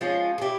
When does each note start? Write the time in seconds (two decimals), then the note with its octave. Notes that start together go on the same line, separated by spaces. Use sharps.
0.01 F3 G#3 C#4 F4
0.38 G#4
0.42 E4 G4